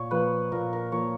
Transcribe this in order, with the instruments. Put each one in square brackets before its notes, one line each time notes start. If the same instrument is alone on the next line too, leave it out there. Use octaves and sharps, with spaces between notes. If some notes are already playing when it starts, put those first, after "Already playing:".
Already playing: [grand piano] A#2 [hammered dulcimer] C#5
[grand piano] F3 A#3 [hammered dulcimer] B4
[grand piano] A#2 [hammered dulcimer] A#4
[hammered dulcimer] A#4
[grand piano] F3 A#3 [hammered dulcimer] C#5